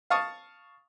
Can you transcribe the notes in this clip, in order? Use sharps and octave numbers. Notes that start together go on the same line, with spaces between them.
F5 A5 C#6 D#6